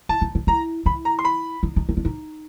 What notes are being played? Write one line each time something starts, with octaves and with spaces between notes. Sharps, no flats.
E4 A5
D#4
D#4
E4 A#5
E4 B5
A#5
C6
B5
D#4
D#4
D#4
D4
D#4